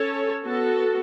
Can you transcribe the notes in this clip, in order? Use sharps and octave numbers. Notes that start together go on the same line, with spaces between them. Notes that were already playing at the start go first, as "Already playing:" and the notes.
Already playing: C#4 A4 C#5
B3 F#4 A4